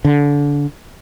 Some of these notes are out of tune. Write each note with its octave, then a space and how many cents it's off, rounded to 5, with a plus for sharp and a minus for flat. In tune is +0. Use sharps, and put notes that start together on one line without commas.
D3 -25